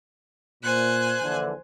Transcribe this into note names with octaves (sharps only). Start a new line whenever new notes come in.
A#2 C5 G#5 F#6
A#1 D3 E3